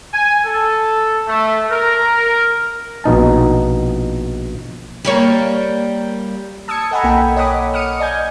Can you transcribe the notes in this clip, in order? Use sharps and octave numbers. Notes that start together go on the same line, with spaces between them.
G#5
A4
A3
A#4
A#1 B2 D#4 A5
G3 A#3 C#5
A5 D#6 E6 G#6 C#7
A4 D#5 F#5 G#5 A#5 B5
B1 A#3 G5 G#5
C#5 D#5 F#5 B5 D6 D#6
D#6 F6 C#7 D#7
D5 D#5 G#5 G6 G#6